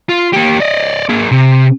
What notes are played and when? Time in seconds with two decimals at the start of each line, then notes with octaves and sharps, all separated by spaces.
0.09 F4
0.33 A#3 G4
0.60 D5 D#5
1.09 A#3 G#4
1.32 C3